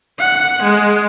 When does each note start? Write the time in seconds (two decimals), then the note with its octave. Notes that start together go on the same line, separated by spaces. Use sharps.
0.19 F#5
0.63 G#3